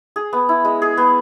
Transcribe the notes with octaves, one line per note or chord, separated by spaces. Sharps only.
G#4
B3
E4
G#3
G#4
B3